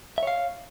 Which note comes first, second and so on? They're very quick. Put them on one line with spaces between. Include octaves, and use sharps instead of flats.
E5 C#5 F5